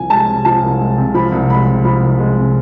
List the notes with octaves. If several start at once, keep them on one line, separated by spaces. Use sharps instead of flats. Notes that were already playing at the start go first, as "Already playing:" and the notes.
Already playing: C2 F3 G#5
G#3 A5
C3
F3 A5
C2
G#3
C3
F3 B5
C2
G#3 B5
C3
F3 B5
C2
G#3
C3